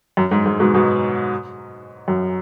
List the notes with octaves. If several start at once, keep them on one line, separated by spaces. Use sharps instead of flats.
F#2
G#2
G#2
G#2 B2
G#2 B2
F#2